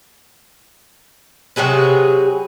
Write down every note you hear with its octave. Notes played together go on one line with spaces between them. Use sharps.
C3 F#3 G#4 B4